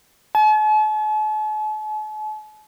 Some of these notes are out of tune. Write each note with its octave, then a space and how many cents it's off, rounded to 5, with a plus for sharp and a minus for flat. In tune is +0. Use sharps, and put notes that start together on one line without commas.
A5 -45